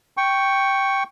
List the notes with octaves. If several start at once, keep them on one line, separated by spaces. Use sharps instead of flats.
G5 C#6